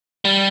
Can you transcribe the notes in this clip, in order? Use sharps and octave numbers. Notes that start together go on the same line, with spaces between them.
G3